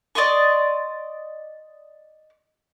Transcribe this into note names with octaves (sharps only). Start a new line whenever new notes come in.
D5 D#5 C6 C#6